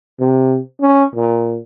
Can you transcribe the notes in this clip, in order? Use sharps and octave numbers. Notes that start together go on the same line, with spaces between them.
C3
C#4
A#2